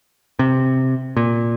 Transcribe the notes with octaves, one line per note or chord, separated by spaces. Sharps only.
C3
A#2